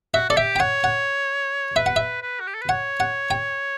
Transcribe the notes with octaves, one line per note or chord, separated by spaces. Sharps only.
F#4 E5
A4 D5
G4 E5
G5
C#5 F#5
F#5
B4 E5
F#5
E5
B4
F#4
G4
A4
B4
C#5 F#5
F#5
G5